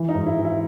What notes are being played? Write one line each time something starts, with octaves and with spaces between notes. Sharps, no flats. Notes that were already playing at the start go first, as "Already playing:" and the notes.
Already playing: E3
D#4
G#2
E4
E3
E4